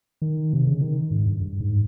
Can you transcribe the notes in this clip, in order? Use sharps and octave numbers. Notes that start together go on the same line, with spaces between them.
D#3
C3
C#3
D#3
G#2
G2
G2
G#2